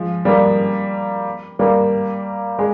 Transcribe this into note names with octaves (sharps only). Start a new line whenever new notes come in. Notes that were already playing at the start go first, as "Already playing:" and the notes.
Already playing: F3 G#3
G3 A#3
G3 A#3
G#3